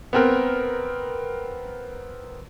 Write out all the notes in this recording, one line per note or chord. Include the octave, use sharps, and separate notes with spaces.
B3 C4 A#4